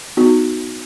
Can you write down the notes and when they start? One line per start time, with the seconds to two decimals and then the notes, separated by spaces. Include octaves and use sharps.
0.17 B3 D#4 F#4